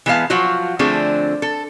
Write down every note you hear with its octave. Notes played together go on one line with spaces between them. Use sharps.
E3 G#3 B3 G#4 F5 A5
F3 F#3 F4 F#4
D3 F3 A3 C4 D4 G#4
A4